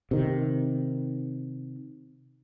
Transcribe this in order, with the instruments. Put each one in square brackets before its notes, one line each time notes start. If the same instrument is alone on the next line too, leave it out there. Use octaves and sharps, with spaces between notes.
[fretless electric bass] C3 D#3